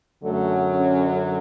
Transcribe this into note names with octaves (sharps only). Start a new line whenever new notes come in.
F#2 D3 F#3 A3
C#4